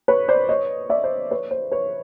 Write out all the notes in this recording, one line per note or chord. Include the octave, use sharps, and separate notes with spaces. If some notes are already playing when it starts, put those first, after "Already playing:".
B4 C#5
C5 D5
C#5 D#5
D5 E5
C5
B4 C#5
C5
B4 C#5